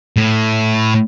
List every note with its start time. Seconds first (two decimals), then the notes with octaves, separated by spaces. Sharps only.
0.17 A2